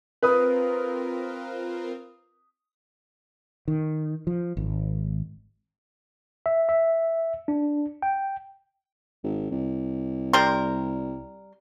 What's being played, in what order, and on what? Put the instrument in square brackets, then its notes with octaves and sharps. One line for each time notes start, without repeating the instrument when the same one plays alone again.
[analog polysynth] C4 F4 A#4 [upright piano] B4 D#6
[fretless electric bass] D#3
F3
G#1
[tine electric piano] E5
E5
D4
G5
[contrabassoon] G#1
C2
[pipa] G3 A#4 C6